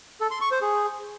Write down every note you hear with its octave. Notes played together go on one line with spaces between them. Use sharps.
A4
C6
C#6
C5
G#4